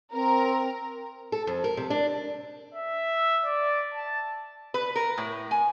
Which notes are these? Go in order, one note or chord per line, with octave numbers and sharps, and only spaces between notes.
C4 A#4
A4
F2
A#4
C3
D4
E5
D5
A5
B4
A#4
A2
G#5